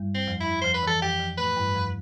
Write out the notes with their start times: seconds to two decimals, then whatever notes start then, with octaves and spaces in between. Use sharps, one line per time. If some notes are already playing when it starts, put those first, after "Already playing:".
Already playing: G2 G3
0.15 C4
0.28 F2 F3
0.41 E4
0.62 F2 F3 C5
0.74 B4
0.83 E3 A4
1.01 F2 F3 G4
1.20 F2 F3
1.38 A2 A3 B4
1.57 G2 G3
1.75 F2 F3